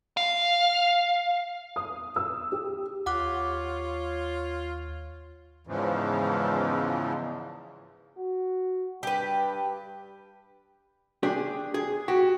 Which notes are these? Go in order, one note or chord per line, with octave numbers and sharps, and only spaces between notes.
F5
D#6
E6
G4
D#2 F4 C#5 F#5 D6 F#6
E2 G#2 C#3 E3 F3
F#4
G2 G4 B4
D4 G4 G#4
G#4
F#4 G4